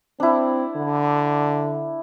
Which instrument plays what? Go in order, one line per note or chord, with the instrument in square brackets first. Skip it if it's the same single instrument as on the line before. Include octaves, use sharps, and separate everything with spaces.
[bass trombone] C4 [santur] D4 E4
[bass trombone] D3